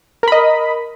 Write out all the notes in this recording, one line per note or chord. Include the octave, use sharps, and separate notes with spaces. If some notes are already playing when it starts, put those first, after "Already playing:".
A#4 D#5 B5